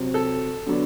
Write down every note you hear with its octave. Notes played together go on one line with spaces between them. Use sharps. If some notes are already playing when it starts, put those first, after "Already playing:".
Already playing: C3 F#3 C4
A4
D3 F#3 B3 D4